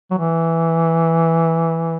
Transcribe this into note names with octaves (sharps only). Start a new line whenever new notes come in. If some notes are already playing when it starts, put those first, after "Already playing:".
F#3
E3